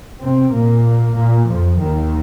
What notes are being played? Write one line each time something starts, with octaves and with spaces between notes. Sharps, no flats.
C3 C4
A#2 A#3
A#2 A#3
F2 F3
D#2 D#3